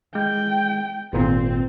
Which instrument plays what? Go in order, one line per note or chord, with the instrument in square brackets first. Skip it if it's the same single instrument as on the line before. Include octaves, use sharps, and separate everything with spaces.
[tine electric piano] G#3 [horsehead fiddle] G5
[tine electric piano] G#1 A#2 [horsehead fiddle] C4